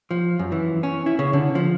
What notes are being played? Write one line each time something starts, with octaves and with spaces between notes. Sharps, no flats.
F3
F#2
E3
C#4
E4
C#3
D3
F3